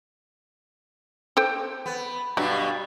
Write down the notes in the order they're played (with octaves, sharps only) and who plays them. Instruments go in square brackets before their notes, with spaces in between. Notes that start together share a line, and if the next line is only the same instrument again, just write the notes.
[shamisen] A4 C5 G5
[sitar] B3
[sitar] G2 B2 G3 [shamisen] F#3